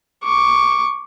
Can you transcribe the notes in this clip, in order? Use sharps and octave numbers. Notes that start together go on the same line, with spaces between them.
C#6 D6